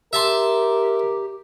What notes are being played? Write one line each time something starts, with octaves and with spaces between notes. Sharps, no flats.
G4 A#4 E5 A5 C6